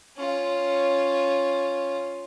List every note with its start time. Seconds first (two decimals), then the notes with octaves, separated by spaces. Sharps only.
0.17 C#4 F4